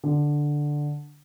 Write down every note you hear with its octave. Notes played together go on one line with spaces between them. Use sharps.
D3